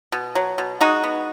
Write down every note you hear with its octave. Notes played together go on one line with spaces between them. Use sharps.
B2
F#3
B2
G#3 D#4 F#4
B3